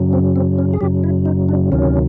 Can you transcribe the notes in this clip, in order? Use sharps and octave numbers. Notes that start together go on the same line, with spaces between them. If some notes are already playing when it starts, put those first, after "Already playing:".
Already playing: F#2 C#3 F#3
C4
C4
C#4
G#4
F#2 C#3 F#3 G4
E4
D#4
D4
D2 C3 D#3 F#3 C#4